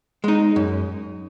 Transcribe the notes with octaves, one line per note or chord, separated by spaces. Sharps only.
G#3 D#4
F#2